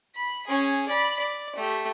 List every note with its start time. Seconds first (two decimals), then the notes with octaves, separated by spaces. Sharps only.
0.15 B5
0.47 C#4 G#4
0.88 D5 B5
1.19 D5
1.56 A3 G4